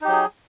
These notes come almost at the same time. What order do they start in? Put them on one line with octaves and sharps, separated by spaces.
D#4 G4 F#3 G#4